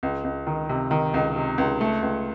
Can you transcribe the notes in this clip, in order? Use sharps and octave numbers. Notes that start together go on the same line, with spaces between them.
C#2
C#2
D#3
C3
D#3
C#2
C3
C#2
A3
C#2